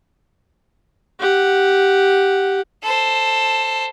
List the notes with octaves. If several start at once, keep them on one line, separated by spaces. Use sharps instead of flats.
G4 F#5
A4 C5